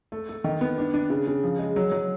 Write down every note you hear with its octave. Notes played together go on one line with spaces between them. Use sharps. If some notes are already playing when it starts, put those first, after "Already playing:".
A3
A3
D#3
B3
D4
D4
C#3
C#3
F3
G#3
F#3
F#3